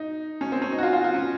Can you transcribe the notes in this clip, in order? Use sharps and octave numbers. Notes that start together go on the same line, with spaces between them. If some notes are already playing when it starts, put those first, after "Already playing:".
Already playing: D#4
C#4
C4
C#4
D#4
F#4
F4
F4
F4
C#4